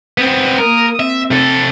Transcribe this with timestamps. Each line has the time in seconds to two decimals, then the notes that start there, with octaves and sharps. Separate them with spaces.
0.18 B3 C4
0.59 A#3 A#4 D#6
1.00 C4 E5
1.31 C3 A4